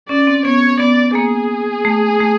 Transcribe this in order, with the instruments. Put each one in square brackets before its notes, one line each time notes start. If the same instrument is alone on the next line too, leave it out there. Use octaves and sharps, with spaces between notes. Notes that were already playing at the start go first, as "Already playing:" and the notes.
[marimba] C#4 [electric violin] D5
[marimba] C4
[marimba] B3 [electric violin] C#5
[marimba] B3 [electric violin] D5
[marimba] A#3 [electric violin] G#4
[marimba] A3
A3